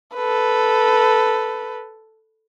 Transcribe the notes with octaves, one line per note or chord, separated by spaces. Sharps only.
A4 B4